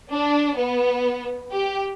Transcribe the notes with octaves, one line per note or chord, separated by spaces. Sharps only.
D4
B3
G4